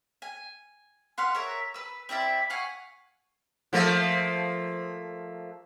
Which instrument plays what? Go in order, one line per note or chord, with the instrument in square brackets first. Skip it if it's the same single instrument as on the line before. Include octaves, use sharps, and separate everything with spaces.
[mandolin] G#5
B4 F5 F#5 C6
A#4 C#5 E5
B4 E6
C4 E4 D5 E5
F5 F#5 G#5 C#6
[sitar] F3 A3 A#3